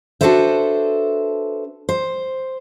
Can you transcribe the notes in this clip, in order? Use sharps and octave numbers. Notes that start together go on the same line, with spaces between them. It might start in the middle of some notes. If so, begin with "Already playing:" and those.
D4 F#4 A4 B4 C5 E5
C5